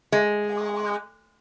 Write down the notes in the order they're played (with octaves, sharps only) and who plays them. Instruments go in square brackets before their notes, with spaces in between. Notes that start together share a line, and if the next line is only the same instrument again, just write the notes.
[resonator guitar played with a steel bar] G#3